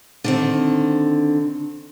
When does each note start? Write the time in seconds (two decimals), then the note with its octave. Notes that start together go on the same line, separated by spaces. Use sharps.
0.24 D3 D#3 C4